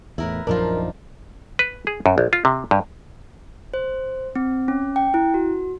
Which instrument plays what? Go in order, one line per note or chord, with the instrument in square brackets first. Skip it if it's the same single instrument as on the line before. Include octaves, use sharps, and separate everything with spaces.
[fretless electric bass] E2 A2 [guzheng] E4 A#4 B4
[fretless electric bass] A#1 F#2 F3 [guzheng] D4 D#4 F4 [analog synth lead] A#4
[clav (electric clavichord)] B4
G#4
F#2
A#1
F4
C3
G2
[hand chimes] C5
C4
C#4
G5
E4
F#4